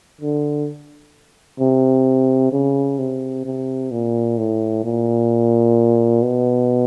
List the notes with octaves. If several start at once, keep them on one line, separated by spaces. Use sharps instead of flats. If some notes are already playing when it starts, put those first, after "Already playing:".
D3
C3
C#3
C3
C3
A#2
A2
A#2
B2